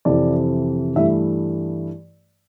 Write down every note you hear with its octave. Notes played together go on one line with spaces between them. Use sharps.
F2 C3 E3 D5
G2 E3 A3 E5